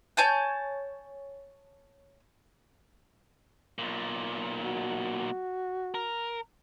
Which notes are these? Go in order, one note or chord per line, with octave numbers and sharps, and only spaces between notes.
C#5 G#5 A5 G6
B1 A#2
F#4
A#4